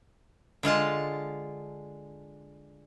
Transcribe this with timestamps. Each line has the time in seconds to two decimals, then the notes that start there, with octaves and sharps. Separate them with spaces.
0.63 D3 G#3 F4 A5